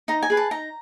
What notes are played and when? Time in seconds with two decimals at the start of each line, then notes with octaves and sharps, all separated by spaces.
0.08 D#4 A#5
0.23 G#5
0.30 G#4 B4
0.37 A5
0.51 D#4 A#5